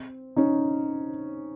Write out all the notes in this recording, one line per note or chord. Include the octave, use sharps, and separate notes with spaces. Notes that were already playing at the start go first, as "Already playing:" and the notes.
Already playing: C4
C#4 D#4